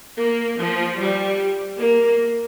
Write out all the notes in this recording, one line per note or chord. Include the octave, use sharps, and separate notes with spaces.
A#3
F3
G3
A#3